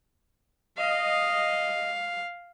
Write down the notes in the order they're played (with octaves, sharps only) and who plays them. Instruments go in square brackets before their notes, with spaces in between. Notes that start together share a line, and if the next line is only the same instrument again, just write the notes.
[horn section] D#5 [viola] F5